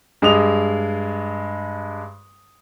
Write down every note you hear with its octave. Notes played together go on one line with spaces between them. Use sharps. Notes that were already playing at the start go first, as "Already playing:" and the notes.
G2 G#3 D#6 F7